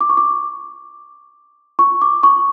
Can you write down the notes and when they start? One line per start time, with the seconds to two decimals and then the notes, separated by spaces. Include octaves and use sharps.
0.01 D6
0.09 C#6
0.17 D6
1.79 C#6
2.02 D6
2.23 C#6